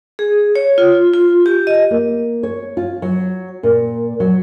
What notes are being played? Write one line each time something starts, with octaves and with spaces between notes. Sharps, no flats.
G#4
C#5
F4
F4
G4
D#5
A#3
C#5
F4
F#3
A#2
F#3